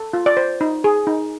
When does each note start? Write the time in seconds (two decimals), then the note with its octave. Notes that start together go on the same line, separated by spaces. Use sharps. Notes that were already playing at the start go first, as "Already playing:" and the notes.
Already playing: A4
0.13 F4
0.26 D5
0.37 C5
0.61 D#4
0.84 G#4
1.07 D#4